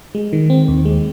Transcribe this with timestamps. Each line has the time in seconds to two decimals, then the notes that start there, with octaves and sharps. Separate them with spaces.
0.15 G#3
0.33 D#3
0.50 C4
0.68 D#2
0.85 G#3